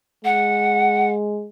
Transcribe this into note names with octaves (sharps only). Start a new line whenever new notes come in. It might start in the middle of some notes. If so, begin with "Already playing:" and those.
G#3 F#5